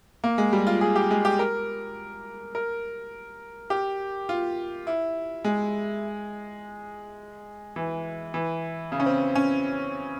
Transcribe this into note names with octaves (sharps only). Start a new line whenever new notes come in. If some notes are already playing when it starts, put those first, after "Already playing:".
A#3
G#3
G3
F4
G#4
G4
G#3
G4
A#4
A#4
G4
F4
E4
G#3
E3
E3
C#3
C#4
C4
C#4